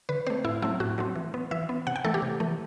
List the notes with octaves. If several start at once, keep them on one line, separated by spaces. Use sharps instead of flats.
D3 B4
A3 C4 C5
A2 E4
F#3 A3 C4 E4
A2 F#4
F#3 A3 C4
E3
B3
E3 E5
B3
C3 F#5
G5
E3 A3 A4
G4
C3
E3 A3